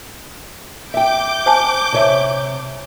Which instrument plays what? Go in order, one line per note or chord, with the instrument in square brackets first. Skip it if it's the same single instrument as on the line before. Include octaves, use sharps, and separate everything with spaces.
[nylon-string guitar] E5 G5 [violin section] D6 G6
[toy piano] C5 G#5 A5
[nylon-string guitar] C3 C#5 E5